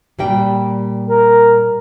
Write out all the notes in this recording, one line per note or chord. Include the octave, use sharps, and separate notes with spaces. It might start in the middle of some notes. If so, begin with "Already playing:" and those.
A#2 G3 G5
A#4